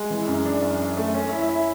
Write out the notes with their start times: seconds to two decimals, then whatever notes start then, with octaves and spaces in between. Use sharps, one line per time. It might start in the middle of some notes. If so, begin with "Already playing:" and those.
Already playing: G#3
0.10 E3
0.28 F#2
0.45 D4
0.62 F#2
0.79 F#2
0.97 A3
1.14 C#4
1.32 E4
1.49 E4